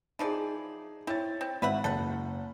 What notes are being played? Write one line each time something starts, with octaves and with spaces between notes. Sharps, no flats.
E3 F3 D#4 G#4 D5
C4 E4 C#5 A6
C4
G#1 B4 E5 F#5
F#1 A4 F#5